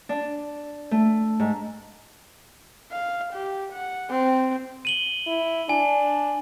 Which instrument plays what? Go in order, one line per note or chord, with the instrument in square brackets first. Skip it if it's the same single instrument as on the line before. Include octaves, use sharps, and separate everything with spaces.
[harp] D4
A3
G#2
[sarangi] F5
G4
F#5
C4
[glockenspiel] D#7 F#7 G7
[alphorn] E4
[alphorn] D4 [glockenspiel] G#5